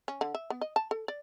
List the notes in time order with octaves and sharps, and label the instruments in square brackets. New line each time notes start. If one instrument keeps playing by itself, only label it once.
[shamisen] C#4
D3
E5
B3
D#5
A5
A4
D5